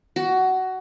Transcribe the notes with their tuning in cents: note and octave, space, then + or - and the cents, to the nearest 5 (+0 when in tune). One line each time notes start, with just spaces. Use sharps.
F#4 +15